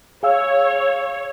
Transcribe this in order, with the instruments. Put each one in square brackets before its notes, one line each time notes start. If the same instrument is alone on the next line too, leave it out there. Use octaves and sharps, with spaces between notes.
[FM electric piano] G#4 F5 E6 [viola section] C#5